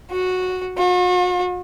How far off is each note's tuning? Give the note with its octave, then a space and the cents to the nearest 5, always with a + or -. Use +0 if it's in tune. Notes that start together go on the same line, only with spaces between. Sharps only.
F#4 -10
F#4 -45